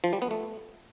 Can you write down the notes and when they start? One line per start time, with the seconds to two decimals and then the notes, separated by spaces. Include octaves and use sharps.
0.04 F3
0.13 G3
0.22 B3
0.31 A3